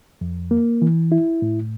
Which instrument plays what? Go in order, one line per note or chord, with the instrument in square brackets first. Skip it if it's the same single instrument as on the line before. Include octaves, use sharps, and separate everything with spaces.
[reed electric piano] F2
A#3
E3
E4
A2